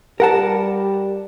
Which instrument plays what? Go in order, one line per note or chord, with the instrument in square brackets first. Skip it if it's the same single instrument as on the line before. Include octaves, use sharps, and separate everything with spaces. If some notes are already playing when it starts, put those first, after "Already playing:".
[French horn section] G3 G4 [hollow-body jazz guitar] A#4 F#5 A5